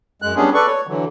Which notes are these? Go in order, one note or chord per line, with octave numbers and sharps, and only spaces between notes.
F#2 G#3 F#6
G3 B3 C#4 D4 G#4
A4 B4 D5 C#6
C#5
D3 E3 F#3